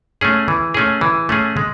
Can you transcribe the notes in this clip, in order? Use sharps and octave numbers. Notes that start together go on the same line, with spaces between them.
A3 C#4 G#4
E3
A3 C#4 G#4
E3
A3 C#4 G#4
G#3